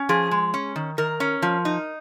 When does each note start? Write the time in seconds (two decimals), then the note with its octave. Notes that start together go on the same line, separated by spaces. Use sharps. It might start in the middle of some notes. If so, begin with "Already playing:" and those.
Already playing: C#4
0.09 F3 G#4
0.31 G#3
0.54 C#4
0.76 D#3
0.98 D#3 A#4
1.20 C#4
1.42 F3
1.65 D#4